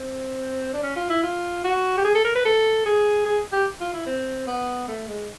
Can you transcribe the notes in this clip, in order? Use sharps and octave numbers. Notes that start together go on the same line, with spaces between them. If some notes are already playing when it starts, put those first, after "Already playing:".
Already playing: C4
D4
C#4
F4
E4
F4
F#4
G4
G#4
A4
A#4
B4
A4
G#4
G#4
G4
F4
E4
C4
B3
A3
G#3